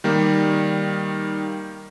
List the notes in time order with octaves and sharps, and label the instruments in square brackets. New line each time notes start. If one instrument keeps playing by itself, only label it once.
[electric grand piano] D#3 G3 A#3